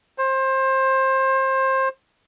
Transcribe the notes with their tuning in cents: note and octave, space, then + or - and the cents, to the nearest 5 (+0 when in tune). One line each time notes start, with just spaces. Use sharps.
C5 +25